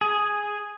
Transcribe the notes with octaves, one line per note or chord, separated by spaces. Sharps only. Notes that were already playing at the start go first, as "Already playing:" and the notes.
G#4